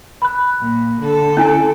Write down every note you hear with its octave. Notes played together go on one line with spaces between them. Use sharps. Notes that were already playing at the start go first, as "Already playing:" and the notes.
B5 F#6
A#2
D3 A4
C#4 E4 G#5